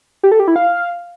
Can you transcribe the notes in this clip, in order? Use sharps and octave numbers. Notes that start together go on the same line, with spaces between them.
G4
A4
G4
E4
F5